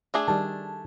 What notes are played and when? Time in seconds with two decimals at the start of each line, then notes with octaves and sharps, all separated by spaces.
0.14 A3 D4 G#4
0.28 D#3 G3 A5